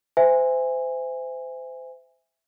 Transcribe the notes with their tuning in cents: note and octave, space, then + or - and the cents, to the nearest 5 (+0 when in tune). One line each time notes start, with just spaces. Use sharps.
C5 -30 E5 +0 G#5 -15